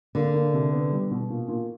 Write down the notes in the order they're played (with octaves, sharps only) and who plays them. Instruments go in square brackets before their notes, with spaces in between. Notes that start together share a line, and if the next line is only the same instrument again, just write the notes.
[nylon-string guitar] D3 [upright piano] A#3
[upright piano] A#3
C3
B3
G3
B2
A#2
A#2